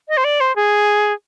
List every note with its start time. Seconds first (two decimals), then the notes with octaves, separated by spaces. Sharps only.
0.09 D#5
0.17 C5
0.24 D5
0.40 C5
0.56 G#4